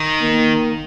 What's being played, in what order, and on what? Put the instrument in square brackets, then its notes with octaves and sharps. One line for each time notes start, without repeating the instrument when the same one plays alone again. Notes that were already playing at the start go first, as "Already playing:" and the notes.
Already playing: [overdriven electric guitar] D#3
[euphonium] A#3